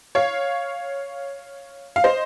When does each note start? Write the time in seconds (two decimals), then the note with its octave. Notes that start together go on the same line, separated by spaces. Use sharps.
0.15 C#5 F5
1.96 F5
2.04 C5 D#5